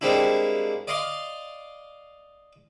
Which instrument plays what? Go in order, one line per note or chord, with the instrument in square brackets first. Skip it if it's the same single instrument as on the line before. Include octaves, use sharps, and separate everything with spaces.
[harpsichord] G3 G#3 A#3 C4 D4 E4
D5 D#5 F5 C6 D6